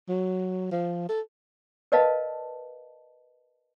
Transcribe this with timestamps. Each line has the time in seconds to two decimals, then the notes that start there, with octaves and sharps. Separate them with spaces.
0.09 F#3
0.71 F3
1.09 A4
1.92 A#4 B4 D5 D#5 F5 A5